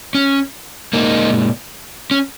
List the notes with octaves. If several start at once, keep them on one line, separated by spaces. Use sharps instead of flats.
C#4
A#2 G#3 A#3 D#4
C#4